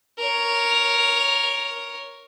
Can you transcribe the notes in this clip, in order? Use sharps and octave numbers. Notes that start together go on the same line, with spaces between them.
A#4 C#5